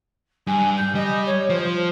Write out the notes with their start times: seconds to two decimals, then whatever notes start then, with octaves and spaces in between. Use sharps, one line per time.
0.47 G2 G#5
0.77 G6
0.95 G3 D#5
1.26 C#5
1.50 F3 C5